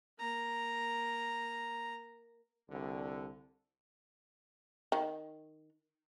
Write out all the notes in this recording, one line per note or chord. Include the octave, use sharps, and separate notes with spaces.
A#3 A#5
C2 D3
D#3